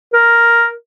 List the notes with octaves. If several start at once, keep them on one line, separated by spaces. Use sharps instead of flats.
A#4